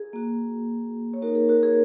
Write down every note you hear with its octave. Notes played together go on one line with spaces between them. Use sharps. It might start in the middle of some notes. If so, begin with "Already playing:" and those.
Already playing: G#4
A#3 F#4
C#5
A#3 D#4 F#4 A#4
G#4
F#4 A#4
G#4 C#5